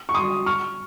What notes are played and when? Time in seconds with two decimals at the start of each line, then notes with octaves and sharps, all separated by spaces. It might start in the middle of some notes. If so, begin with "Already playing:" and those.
0.09 C#6
0.14 C6 D#6
0.46 C#6 F6